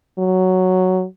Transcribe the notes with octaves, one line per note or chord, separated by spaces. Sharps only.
F#3